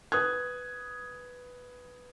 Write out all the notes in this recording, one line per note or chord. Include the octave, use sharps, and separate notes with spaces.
B4 D#6 F#6 G#6